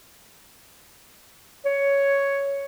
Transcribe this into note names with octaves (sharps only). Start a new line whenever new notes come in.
C#5